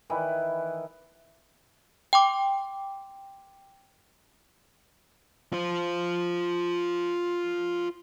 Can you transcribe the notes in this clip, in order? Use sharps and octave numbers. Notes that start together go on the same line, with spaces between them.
D#3 E3 E4 B4
G5 C6 D6
F4 C5